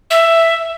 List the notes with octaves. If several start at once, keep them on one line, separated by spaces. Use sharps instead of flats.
E5